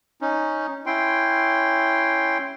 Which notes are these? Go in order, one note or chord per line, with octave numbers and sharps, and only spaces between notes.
C#4 D#4
C#4 E4 G5 C6